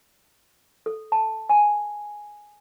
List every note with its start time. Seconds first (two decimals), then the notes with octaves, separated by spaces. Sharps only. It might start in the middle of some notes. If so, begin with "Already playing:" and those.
0.86 A4
1.12 A5
1.49 G#5